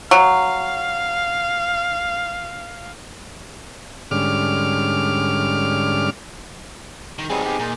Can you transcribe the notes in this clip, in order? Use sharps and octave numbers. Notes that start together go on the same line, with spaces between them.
F#3 F5
G#2 D3 G3 C#4 D6 F6
D#3
F#3 G3 B3 C4 D#4 G#4
B3 G4
A#2 D#4